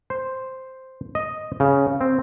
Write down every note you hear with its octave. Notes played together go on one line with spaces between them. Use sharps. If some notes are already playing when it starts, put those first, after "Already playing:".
C5
D#5
C#3
C4